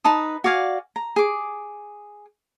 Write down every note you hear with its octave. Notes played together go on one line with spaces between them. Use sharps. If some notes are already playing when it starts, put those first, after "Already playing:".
D#4 B4 A5 D#6
F#4 D5 F5 G#5
A#5
G#4 D6